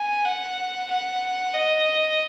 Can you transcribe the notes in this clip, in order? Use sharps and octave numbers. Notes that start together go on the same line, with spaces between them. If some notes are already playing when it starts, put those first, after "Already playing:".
Already playing: G#5
F#5
F#5
D#5